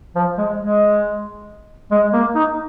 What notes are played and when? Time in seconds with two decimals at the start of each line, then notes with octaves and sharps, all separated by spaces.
0.15 F3
0.38 G#3
0.60 G#3
1.91 G#3
2.13 A#3
2.35 D#4